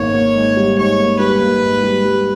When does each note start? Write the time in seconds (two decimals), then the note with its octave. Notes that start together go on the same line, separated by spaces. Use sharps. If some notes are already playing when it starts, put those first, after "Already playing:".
Already playing: G#1 G#2 A#3 C#5
0.14 A#3
0.35 G#2
0.57 G3
0.77 G#2 C#5
0.99 A#3
1.19 G3 B4
1.41 A#3
1.62 G#2
1.83 G3
2.04 G3